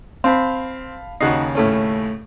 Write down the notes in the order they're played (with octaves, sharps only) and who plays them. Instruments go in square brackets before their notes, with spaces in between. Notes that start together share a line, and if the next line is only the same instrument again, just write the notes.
[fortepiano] C4 [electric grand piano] F5 A5 B5
[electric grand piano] D#2 C#3 C7 [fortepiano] D#4 F#4
[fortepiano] A2 A3 C#4